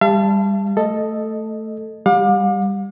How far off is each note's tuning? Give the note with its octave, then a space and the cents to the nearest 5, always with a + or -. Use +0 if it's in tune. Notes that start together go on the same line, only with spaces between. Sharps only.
G3 +25 F5 -45 A5 +0
A3 +0 A4 +0 D#5 +0
G3 +10 F5 +40 D6 +20